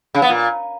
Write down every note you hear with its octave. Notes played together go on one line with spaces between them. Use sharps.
C#3
B3
A#2